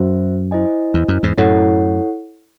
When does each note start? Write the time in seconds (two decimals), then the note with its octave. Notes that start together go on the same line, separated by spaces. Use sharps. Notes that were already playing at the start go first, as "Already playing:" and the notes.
Already playing: F#2 F#4 C5 E5
0.51 E4 C5 D#5 G#5
0.94 E2
1.08 F#2
1.23 E2 G#2
1.38 F#2 A2 E4 A4 C#5 F#5